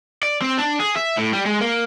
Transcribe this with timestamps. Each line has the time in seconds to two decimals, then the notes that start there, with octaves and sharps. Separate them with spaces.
0.23 D5
0.42 C4
0.58 D4
0.80 G#4
0.96 E5
1.17 A2
1.33 G3
1.45 G#3
1.61 A#3